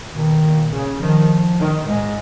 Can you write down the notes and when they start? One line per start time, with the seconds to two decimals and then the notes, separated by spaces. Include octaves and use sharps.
0.13 B2 D#3
0.43 A#2
0.72 C#3
1.00 D#3 F3
1.59 D#3
1.87 G#2 G#3